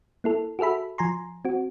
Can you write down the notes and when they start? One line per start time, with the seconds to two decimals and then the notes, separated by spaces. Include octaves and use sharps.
0.24 A#3 E4 A4
0.59 F#4 G#4 A4 E5 B5
0.98 F3 G#5 A#5 C6
1.45 C4 F#4